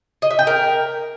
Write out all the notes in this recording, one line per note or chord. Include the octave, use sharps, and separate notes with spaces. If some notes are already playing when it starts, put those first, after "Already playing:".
D#5
E5
G5
A#4